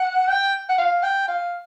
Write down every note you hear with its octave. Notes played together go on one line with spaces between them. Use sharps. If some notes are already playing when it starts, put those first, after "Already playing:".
Already playing: F#5
G5
F#5
F5
G5
F5